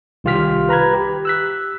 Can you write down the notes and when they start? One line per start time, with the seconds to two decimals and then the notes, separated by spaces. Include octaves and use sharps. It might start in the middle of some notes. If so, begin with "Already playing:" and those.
0.24 C2 D#3 F4 G4 F6 B6
0.69 B4 A#5 B5 G#6
0.94 G4
1.25 E6 F#6 B6